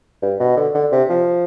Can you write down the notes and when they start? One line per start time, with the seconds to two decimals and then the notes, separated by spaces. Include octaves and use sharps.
0.22 G2
0.40 B2
0.57 D3
0.74 D3
0.92 C3
1.09 F3